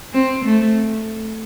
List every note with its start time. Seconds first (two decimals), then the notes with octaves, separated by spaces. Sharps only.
0.13 C4
0.45 A3